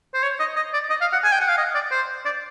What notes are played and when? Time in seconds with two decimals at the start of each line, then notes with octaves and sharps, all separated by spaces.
0.14 C5
0.23 C#5
0.40 D#5
0.56 D#5
0.74 D5
0.90 D#5
1.01 F5
1.13 F#5
1.24 G#5
1.32 G5
1.41 F#5
1.49 F5
1.58 D#5
1.75 D5
1.91 C5
2.25 D5